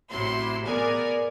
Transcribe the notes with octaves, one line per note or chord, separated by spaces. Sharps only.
A1 C3 F#3 E4 C6
B3 G#4 A#4 D5 G#5